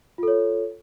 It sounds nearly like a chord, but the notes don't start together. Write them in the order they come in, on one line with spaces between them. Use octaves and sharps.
F4 A4 C#5